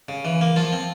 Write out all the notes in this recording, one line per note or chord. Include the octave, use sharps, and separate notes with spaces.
C#3
E3
A#3
F3 F4
C4